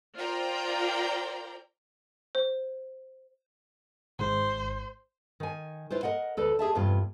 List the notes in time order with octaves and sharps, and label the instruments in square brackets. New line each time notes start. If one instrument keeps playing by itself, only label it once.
[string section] F4 A#4 C5 D5 G5 A#5
[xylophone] C5
[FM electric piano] G#1 G#2 [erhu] C5
[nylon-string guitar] D#3 G#5
E4 F4 B4 C5
A#4 D#5 F#5
D2 A4 B4 D5
G4 G#4 E5 A5
E2 G2 C3 F4